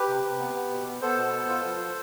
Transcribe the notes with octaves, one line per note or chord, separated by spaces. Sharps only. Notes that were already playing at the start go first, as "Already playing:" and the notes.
Already playing: G4 B4
C3
C3
B3
B3
B2
B3
B3 A4 C5
B2
B3
F4
F3